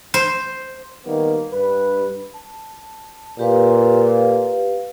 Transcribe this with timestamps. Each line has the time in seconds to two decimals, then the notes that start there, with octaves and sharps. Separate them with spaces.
0.14 C5
1.05 D#3 G3 A#3 B3
1.53 G2 B4
2.34 A5
3.39 A#2 G4 B4 F5